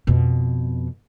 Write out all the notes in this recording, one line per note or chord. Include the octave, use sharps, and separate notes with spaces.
F2 B2